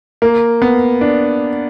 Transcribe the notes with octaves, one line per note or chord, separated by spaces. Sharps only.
A#3
B3
D4